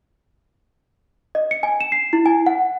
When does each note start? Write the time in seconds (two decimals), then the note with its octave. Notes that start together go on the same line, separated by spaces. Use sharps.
1.35 D#5
1.51 C#7
1.63 G#5
1.81 E7
1.92 C7
2.13 E4
2.26 G#5
2.46 F#5